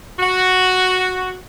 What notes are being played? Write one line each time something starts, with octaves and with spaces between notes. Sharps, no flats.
F#4